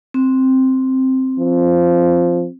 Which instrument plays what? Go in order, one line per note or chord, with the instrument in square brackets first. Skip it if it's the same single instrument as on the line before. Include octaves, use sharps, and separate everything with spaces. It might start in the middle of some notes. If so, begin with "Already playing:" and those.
[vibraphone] C4
[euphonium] F3